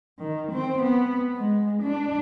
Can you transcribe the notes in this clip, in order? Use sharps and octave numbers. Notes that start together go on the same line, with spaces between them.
D#3
C4
B3
G#3
D4